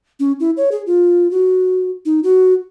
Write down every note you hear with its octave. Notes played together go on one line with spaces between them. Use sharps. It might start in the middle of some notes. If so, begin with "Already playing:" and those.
C#4
E4
C#5
G#4
F4
F#4
D#4
F#4